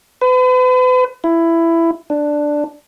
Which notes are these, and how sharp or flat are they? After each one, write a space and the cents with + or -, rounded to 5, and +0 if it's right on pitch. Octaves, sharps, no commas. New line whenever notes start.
B4 +40
E4 +15
D4 +5